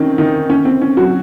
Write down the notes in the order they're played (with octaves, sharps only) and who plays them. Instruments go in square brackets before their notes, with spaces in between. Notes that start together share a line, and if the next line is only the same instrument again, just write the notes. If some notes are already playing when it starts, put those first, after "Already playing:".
Already playing: [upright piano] D#3 C4 C#4 D#4
D#3 D#4
C#4
C4
C#4
F#3 F#4